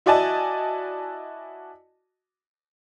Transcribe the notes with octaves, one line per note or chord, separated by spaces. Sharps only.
E4 F#4 D5 D#5 G#5 A5